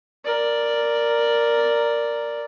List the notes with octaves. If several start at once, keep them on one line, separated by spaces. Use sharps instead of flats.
A#4 D5